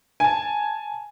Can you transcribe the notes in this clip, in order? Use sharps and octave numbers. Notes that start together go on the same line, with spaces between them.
G#5 A5